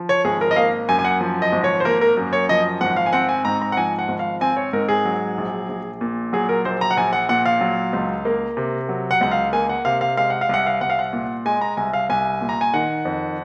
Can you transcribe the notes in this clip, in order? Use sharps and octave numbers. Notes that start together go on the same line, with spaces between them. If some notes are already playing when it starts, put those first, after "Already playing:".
Already playing: F3
C#5
G#1 G#4
A#4
D#5
A#3 F5
F#2 G#5
G#5
F#5
F3
D#5
G#1
C#5
C5
A#3 A#4
A#4
F#2
C#5
F3 D#5
G#1 F#5
F5
G#5
C4 F#5
G#5
G#2 A#5
A#5
F#5
F3 G#5
F#5
G#1
F5
C4 G#5
C#5
G#2 A#4
G#4
F#3
A#1
A#1
A#2
F#3 G#4
A#4
A#1 C5
A#5
F#5
A#1 G#5
F#5
A#2 F#5
F5
F#3
C#2
A#3
C3
F#3
F#5
C#2 F#5
F5
A#3 G#5
F#5
C3 F5
F5
G#3 F5
F#5
F5
C2 F#5
F5
C2 F#5
F5
F#5
A#2
G#3 G#5
A#5
C2 G#5
F5
C2 G#5
A#2
A#5
G#5
D#3 F#5
F2